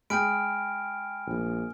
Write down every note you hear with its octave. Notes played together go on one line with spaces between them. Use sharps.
G#3 G5 G#5 B5 F6 D7
A#1